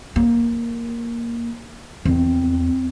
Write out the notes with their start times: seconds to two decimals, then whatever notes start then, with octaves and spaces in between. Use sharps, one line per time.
0.16 A#3
2.05 E2 C4